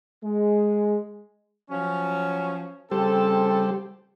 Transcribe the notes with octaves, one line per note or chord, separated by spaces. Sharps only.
G#3
F3 F#3 C#4
C#3 G3 C4 G4 A4 C5